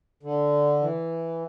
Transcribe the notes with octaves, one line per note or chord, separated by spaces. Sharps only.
D3
E3